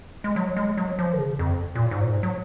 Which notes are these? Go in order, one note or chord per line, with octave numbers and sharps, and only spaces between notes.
G#3
F#3
G#3
F#3
F3
D#3
C#3
F2
A#2
G#2
A#2
G#2
F#3